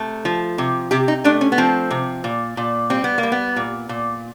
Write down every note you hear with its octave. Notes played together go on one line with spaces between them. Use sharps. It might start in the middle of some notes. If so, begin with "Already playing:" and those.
Already playing: C3 A3
F3
C3
C3 G4
D#4
A3 D4
C#4
B3
F3 C4
C3
A#2
A#2
G3 C4
B3
A#3
G3
B3
A#2
A#2